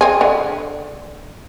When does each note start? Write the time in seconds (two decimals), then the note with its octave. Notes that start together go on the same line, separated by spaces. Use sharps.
0.01 C4 G#4
0.21 D3